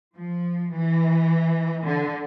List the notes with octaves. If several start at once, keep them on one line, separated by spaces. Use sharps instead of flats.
F3
E3
D3